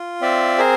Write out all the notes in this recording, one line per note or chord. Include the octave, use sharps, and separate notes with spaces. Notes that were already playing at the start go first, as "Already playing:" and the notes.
Already playing: F4
C4 D5 E5
G#4 A#4 C5